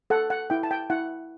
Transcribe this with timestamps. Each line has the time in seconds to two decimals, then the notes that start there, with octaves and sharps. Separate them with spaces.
0.10 A4 F#5
0.30 F#5
0.50 E4 G5
0.63 A5
0.71 G5
0.90 E4 F#5